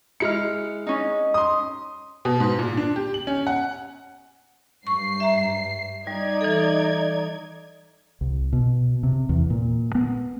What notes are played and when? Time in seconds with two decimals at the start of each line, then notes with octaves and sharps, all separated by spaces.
0.20 G#3 E4 F6 C#7
0.87 C#4 D#4
1.34 C6 D#6
2.25 B2
2.40 G#2
2.59 A#2
2.77 D4
2.96 G4
3.14 F#7
3.27 C#4
3.47 F#5
4.87 G2 C#6 C7
5.20 E5 A#5
6.07 G3 D#4 D5 G#6
6.41 E3 A4
8.21 C2
8.53 B2
9.03 C3
9.29 E2
9.50 A#2
9.95 B3